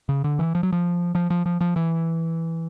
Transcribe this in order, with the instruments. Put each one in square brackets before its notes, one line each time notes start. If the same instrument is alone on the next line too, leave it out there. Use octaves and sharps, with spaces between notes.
[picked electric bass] C#3
D3
E3
F3
F#3
F3
F3
F3
F3
F3
E3